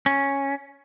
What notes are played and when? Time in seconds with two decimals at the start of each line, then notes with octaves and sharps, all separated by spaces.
0.06 C#4